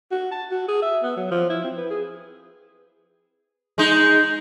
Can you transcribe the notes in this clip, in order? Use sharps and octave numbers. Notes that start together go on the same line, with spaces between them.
F#4
A5
F#4
G#4
E5
B3
F#3
F3
E4
C4
B4
G#4
G#3 D#4